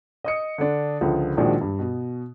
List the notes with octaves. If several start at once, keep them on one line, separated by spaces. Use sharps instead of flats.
D#5 D#6 C#7
D3 D4
C#2 D3 F3
A#1 D#3 F3 G#3 D4 F#4
G2
B2